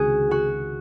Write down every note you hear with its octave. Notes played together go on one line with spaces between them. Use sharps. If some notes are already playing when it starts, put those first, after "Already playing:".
Already playing: C#2 C3 D#3 F#4 G#4
F#4